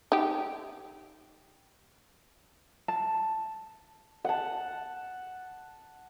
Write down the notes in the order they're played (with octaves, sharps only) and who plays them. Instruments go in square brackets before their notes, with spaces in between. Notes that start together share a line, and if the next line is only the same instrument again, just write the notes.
[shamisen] D#4 G4
[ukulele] A5
[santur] F#5 A5